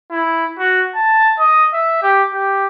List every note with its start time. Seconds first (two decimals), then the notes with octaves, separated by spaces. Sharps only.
0.11 E4
0.59 F#4
0.96 A5
1.39 D#5
1.73 E5
2.02 G4
2.33 G4